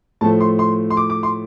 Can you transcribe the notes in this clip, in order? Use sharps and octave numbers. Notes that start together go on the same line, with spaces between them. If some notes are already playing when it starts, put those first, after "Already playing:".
A2 F3 A3 A5
C6
C6
C6
D6
D6
C6